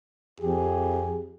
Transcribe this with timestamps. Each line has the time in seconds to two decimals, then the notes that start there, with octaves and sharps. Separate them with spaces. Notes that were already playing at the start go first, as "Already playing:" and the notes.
0.41 F2 G4 G#4